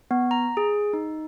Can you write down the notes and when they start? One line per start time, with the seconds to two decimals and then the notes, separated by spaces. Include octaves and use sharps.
0.11 B3
0.31 A#5
0.57 G#4
0.93 D#4